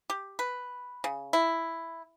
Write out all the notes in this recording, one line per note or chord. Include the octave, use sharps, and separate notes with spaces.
G4
B4
C#3
E4